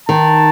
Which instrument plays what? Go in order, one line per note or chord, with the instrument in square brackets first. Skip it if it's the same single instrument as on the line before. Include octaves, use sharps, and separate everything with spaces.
[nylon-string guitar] D#3 [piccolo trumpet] A5